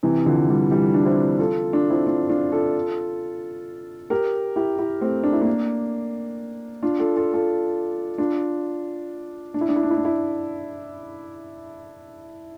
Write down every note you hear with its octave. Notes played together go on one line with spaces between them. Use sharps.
C3 E3
D3 F3
E3 G3
E3 G3
D4
C4 E4
F4 A4
D4 F4
C4 E4
D4 F4
D4 F4
F4 A4
G4 A#4
E4 G4
E4 G4
A3 C4
D4
E4
A#3 D4
D4 F4
F4 A4
F4 A4
F4 A4
D4 F4
D4
E4
D4
E4
D4
E4
D4
E4